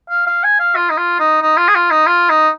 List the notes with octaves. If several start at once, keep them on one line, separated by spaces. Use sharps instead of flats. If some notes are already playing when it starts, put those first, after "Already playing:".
F5
F5
G#5
F5
F4
D#4
F4
D#4
D#4
F4
G#4
F4
D#4
F4
D#4